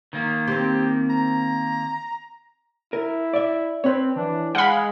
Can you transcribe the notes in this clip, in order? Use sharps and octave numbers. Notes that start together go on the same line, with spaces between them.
D#3 A#3
C4 G4 C5
A#5
E4 A#4
D5 E5
C4 B4 C#5
E3 D4
G#3 F5 F#5 B5